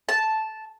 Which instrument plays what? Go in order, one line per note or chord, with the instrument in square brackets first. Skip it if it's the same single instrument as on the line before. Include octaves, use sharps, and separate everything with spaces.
[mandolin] A5